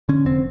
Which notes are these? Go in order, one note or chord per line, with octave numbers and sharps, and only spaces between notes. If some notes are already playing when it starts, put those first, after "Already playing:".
D3 C#4
F1 C4